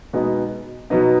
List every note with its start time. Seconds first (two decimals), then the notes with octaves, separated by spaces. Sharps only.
0.13 B2 G#3 B3 D#4
0.90 B2 F#3 B3 D#4